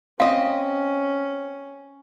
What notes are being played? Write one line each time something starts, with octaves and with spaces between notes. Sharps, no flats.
C4 C#4 D#5 F5